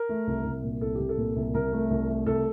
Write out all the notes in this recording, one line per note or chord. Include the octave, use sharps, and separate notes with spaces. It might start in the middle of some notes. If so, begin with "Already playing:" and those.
Already playing: A#4
A3
C2
C2
A#2
C2 A4
C2 G4
A4
A#2
C2
C2 A#4
A3
C2
A3
C2 A4